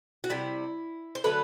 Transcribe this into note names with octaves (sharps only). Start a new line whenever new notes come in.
F#4
C3 G3 E4
C5
D3 F#3 A3 B4